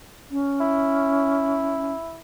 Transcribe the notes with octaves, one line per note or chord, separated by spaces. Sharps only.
C#4
E4